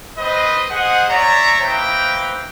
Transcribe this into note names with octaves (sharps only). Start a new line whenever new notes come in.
C4 B4 C5 D#5
G#4 C5 D#5 F#5
C#5 D5 E5 A#5
A#3 D#4 B4 C5 E5 G5